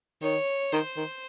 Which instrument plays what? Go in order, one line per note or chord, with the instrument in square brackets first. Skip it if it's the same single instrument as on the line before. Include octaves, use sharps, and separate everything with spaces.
[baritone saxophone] D#3 [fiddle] C#5
[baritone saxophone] D#3 [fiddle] C5
[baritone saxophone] D#3